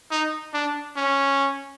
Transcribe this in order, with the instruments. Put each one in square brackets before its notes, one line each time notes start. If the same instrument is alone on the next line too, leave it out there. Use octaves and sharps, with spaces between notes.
[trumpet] D#4
D4
C#4